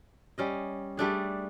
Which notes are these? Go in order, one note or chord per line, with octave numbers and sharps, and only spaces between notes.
G3 C#4 D#5
G3 A3 D4 G#4